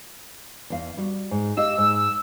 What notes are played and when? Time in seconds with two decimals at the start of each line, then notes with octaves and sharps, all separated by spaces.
0.70 E2 F5
0.97 G3 F#4
1.31 G#2
1.57 G4 D#5 F5 E6
1.78 G#2